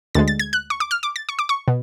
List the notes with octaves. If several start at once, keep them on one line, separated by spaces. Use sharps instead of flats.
D2 D3 G#3 A6
A6
G#6
F#6
C#6
D6
F6
D6
A6
C#6
D6
C#6
B2